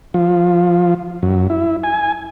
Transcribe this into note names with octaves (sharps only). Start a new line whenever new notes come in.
F3
F#2
E4
G#5